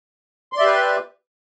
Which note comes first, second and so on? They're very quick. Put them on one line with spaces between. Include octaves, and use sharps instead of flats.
C6 D5 E5 G4 B4